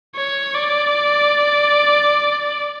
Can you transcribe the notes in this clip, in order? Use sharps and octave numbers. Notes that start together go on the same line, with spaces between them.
C#5
D5